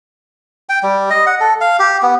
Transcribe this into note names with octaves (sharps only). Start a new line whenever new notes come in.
G5
G3
D#5
F#5
A4
F5
G4
B3